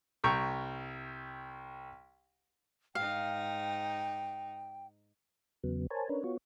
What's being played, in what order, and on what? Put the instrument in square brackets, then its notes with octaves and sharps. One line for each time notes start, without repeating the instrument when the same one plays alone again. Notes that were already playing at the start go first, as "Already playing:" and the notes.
[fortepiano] C2 G5 A#5 C#6
[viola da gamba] G#2 D#4 [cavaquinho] F5 [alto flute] G5
[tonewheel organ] E2 C#3 F#3 B3
A#4 C5 C#5 G#5 A5
C#4 D4 A#4 B4 C#5
B3 F4 F#4 C#5